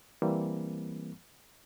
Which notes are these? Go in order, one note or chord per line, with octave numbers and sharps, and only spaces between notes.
E3 G3 A#3 C4